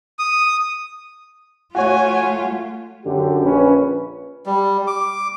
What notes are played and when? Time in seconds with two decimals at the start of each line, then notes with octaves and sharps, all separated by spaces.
0.19 D#6
1.75 A3 F4 F#4 C#5 G#5
3.06 F#2 D3 G4
3.43 A#1 C#4 B4
4.46 G3
4.87 D6